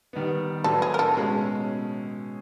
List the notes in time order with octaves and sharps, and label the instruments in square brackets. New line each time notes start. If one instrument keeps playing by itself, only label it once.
[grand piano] D#3 G3 B3
[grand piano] A2 F#3 B3 D4 [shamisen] A4
[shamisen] G#4
A#4
A4
[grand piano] B2 G#3 C#4